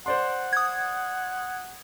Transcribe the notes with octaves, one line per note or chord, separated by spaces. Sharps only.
C5 D5 F#5 C6
D#6 G#6